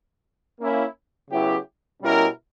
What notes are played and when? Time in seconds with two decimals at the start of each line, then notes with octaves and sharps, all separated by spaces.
0.60 A#3 C#4 E4
1.31 C#3 F#3 B3 E4 G4
2.02 B2 G3 C#4 E4 A#4